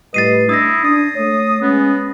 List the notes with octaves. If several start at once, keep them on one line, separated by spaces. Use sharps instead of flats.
A2 G3 B4 D#5 A6 C7 D#7
D4 E4 D#6 A#6
D4 D#6 A6
A3 C#5
G#3 B3 C#4